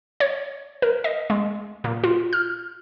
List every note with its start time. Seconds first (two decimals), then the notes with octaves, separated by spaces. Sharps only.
0.20 C#5
0.82 A#4
1.04 D#5
1.30 G#3
1.84 A#2
2.04 F4
2.33 F6